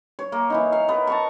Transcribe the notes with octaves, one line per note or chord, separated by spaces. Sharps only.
C#5
A#3
E3 B3 D#4
F5
B3 A#4
A5 A#5 C#6